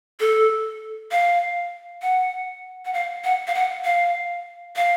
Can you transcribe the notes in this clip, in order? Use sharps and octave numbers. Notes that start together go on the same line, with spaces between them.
A4
F5
F#5
F#5
F5
F#5
F5
F#5
F5
F5